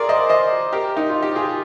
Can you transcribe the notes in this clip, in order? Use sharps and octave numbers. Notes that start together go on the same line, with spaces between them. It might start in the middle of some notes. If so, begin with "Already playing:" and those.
Already playing: F4 G#4 A#4 D5
C5 D#5
C5 D#5
G4 A#4
D#4
F4
G4
F4 G#4